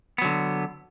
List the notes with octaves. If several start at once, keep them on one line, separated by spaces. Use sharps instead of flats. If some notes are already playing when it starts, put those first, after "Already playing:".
D3 F#3 B3